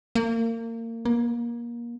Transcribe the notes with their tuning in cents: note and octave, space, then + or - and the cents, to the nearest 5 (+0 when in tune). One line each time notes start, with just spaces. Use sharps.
A#3 -30
A#3 +25